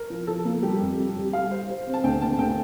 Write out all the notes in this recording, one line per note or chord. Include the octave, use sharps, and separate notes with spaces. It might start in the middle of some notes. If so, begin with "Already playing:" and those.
Already playing: A#4
F3
F3 A4
A#3
G3 G4
F2
G3
G3
G3 F5
C5
C5
C4
A5
D2 G5
A#3 A5
D2 G5